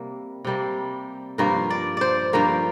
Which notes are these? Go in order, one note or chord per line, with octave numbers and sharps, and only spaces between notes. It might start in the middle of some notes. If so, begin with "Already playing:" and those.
Already playing: C3 G3 A#3
C3 G3 A#3
G2 F3 A#3 A#4
D5
C5 D5
G2 F3 A#3 A#4